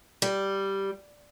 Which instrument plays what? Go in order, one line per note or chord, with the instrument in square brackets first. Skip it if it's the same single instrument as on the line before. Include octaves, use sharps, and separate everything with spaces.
[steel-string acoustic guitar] G3